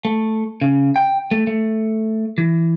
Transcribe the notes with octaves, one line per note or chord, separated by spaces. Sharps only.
A3
C#3
G5
A3
A3
E3